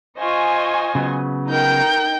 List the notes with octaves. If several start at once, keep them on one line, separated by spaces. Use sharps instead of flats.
F4 C5 D#5 G#5 C#6
C#3 F#3 B3
D#4 A#4 G5 G6